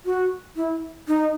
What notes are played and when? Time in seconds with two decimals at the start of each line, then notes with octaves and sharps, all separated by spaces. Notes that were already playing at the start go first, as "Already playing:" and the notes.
0.05 F#4
0.56 E4
1.08 D#4